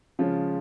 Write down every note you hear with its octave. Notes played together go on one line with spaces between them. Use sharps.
C#3 F3 G#3 C#4 F4